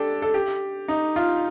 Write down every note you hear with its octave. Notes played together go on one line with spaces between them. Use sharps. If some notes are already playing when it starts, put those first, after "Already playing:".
Already playing: D4 G4 A4
A4
G4
D#4
F4